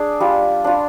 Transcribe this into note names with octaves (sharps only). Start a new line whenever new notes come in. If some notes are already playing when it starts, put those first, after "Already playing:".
Already playing: D4 G#4
G3 F4
D4 F4